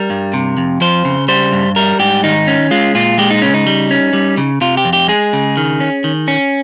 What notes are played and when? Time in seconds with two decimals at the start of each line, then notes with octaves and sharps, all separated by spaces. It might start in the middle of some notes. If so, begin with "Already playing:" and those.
Already playing: G3 A#4
0.10 G2
0.34 C3
0.57 F2
0.81 F3 C5
1.05 C#3
1.28 G3 C5
1.53 G2
1.76 G3 A#4
1.99 G#2 G4
2.24 D#3 D#4
2.47 C#4
2.71 G#3 F4
2.95 A#2 F4
3.18 G#3 G4
3.30 D#4
3.42 C#3 C#4
3.54 D#4
3.67 G3
3.91 C#4
4.13 G3
4.37 C#3
4.61 C3 F4
4.77 G4
4.85 F2
4.93 G4
5.09 G#3 G#4
5.33 C#3
5.57 D#3
5.80 C#4
6.04 D#3
6.28 C#4